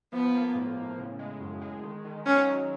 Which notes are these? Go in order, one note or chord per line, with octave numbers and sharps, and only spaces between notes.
F3 B3
A#3
A2
A2
C#3
G#3
F#2
G#3
D#3
D#3
F#3 C#4
F#3